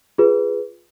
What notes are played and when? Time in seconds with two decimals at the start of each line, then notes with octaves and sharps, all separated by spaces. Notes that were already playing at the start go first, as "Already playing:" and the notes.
0.18 F4 G#4 B4